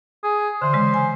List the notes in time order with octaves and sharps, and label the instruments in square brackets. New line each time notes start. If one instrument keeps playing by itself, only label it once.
[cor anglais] G#4
[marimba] D3 E3 [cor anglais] C5
[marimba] C#3 G#3
G#5